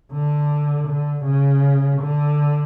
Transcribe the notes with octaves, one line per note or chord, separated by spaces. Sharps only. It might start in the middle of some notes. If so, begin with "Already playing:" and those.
D3
D3
C#3
D3